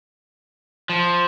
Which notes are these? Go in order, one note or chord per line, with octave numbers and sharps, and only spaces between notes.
F3